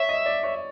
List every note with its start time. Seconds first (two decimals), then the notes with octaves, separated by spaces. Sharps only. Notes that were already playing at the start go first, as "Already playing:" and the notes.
Already playing: C#5 E5
0.09 D#5
0.26 D5
0.43 C#5